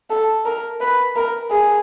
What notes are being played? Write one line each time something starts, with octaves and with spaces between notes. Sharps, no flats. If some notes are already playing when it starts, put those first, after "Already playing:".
A4
A#4
B4
A#4
G#4